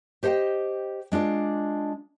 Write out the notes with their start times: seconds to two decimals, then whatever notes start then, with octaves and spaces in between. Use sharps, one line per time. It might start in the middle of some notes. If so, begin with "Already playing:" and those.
0.23 G4 C5 D#5 F#5 G5
1.12 G#3 D4 F4 D5